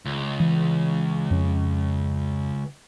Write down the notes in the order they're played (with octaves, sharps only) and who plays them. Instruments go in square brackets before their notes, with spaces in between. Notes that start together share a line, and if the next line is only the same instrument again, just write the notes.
[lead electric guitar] C#2
[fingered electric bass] E3
F2 C#4